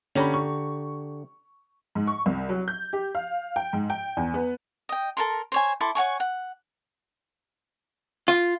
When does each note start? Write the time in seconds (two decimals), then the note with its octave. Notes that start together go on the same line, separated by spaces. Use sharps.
0.15 D3 C#4 G4 A#5 B5
0.34 C#6
1.95 G#2
2.07 C#6
2.26 C2
2.49 F#3
2.68 G6
2.93 G4
3.15 F5
3.56 G5
3.73 G#2
3.90 G5
4.17 E2
4.34 B3
4.89 D#5 G5
5.17 A4 A#4 C6
5.52 C5 C#5 G#5
5.80 E4 A4 C6 D6
5.95 C#5 F#5 G#5 C#6
6.20 F#5
8.28 F4